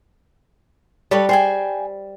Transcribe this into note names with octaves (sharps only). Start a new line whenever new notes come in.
G3 A4 B4 C#5
G#4 C5 G5 G#5